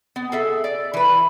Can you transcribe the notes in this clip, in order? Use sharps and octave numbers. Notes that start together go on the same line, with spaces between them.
B3
G#4 A4 E5
D5
E3 B4